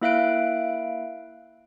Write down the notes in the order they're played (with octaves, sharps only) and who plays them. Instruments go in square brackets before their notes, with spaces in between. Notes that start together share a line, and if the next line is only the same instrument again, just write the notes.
[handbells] A#3 E4 E5 F5 F#6 D7